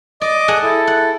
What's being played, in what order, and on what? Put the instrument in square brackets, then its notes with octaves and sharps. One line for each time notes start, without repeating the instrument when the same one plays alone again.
[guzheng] D5 [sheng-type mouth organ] D#5 D6
[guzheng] G#4 F#5 A5
[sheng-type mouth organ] E4 A4
[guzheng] F#5